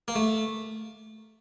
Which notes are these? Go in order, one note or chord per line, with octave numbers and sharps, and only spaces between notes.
A#3
A3